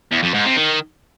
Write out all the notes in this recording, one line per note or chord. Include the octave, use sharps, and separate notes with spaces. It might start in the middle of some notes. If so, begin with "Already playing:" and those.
E2
F2
G#2
C3
D#3